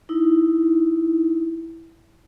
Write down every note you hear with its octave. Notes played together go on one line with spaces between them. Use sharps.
D#4 E4